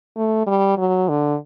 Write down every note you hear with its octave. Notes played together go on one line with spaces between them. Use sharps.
A3
G3
F#3
D3